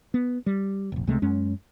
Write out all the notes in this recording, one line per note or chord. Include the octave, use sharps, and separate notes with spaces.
B3
G3
F1 A#1
C#2 C3 G#3 A3
F#2 G#3 C#4